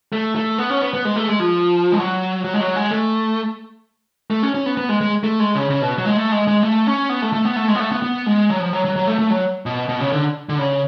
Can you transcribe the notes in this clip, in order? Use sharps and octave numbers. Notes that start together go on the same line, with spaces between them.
A3
A3
B3
C#4
B3
B3
G#3
A3
G#3
F3
G#3
F#3
F#3
G#3
F#3
G#3
A3
A3
C#4
C#4
B3
B3
G#3
G#3
A3
G#3
C#3
C#3
B2
F#3
G#3
A3
G#3
G#3
A3
C#4
B3
A3
A3
B3
A3
G#3
B3
A3
B3
B3
G#3
F#3
F3
F#3
F#3
F#3
A3
A3
F#3
B2
B2
C#3
D3
D3
C#3